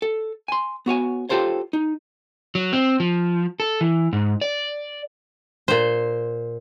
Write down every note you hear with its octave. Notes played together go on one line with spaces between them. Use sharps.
A4
G#5 C6
B3 F#4 C#5 G#5
F4 G4 A4 C5 C#5
D#4
F#3
C4
F3
A4
E3
G#2
D5
A#2 C5